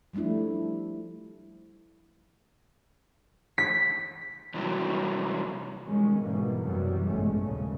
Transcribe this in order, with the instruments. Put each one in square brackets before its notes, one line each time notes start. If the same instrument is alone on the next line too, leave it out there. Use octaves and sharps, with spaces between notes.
[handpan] F3 G3 A3 D4 E4
[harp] B6
[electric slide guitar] C3 E3 F#3 G3
[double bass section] B2 D#3 G3 G#3 C#4
G#2 B2 D3 E3 G3 A#3
F#2 C3 E3 F#3 G3
A1 G2 B2 G#3 A3 C#4
D#2 A#2 C#3 F3 G3